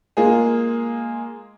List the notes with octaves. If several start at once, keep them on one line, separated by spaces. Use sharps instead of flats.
G#3 A#3 F4 G#4